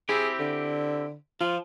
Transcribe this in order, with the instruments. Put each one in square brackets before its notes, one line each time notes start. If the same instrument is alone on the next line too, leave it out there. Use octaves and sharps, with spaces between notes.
[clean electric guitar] C4 E4 G4 [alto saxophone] G#4
[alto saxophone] D3
[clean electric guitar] F3 [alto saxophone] F4